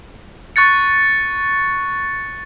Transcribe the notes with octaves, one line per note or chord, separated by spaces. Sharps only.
C#6 F#6 A6 C#7